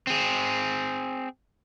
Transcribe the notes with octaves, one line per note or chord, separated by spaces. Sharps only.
C4 G#4